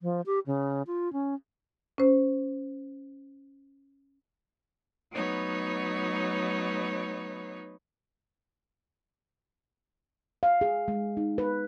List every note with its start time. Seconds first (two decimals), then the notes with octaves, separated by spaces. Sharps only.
0.01 F3
0.26 G4
0.46 C#3
0.87 F4
1.13 C#4
1.98 C#4 C5
5.12 F#3 A3 B3 D#4 B4 C#5
10.43 F5
10.61 G#4
10.88 G#3
11.17 D#4
11.38 B4